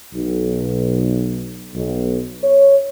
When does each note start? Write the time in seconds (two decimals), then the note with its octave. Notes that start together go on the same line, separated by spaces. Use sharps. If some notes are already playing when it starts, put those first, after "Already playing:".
0.13 B1
1.75 B1
2.44 C#5